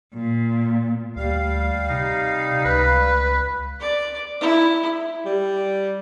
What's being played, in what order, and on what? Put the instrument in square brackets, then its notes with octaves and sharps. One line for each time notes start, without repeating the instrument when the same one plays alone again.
[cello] A#2
[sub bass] D2 [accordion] G3 F5
[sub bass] C3 [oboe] D#4
[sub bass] C#2 [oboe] B4
[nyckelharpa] D5
E4
[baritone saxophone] G3